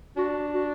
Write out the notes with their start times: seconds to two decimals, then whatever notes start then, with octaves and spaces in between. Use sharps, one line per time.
0.16 D4 F#4
0.54 F#4